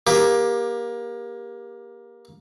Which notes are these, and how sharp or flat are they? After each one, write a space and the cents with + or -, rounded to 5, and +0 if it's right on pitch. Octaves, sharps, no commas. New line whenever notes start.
A#3 +20 G4 +20